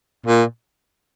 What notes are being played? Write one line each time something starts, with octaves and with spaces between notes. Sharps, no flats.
A#2